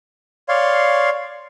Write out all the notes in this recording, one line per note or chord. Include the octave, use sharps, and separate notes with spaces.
C#5 D5 F5 C6